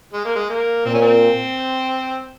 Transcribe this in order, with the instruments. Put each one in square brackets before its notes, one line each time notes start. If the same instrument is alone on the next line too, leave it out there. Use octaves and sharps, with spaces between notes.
[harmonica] G#3
A#3
G#3
A#3
[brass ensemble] A#2 [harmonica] C4
[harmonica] C#4
C4